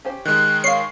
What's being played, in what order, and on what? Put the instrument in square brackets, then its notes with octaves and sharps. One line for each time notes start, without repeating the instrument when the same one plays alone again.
[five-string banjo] C#4 G4 C5
[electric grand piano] D#3 G#3 [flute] F#6
[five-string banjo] C#5 F5 [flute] C#6 [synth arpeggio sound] C7